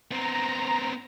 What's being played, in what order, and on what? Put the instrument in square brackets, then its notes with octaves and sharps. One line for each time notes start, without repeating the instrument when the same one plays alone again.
[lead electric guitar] B3 C4 [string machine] A#5